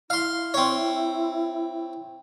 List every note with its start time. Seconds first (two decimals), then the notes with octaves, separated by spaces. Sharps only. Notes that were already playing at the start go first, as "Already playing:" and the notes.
0.10 E4 F5 C6
0.54 C4 C#5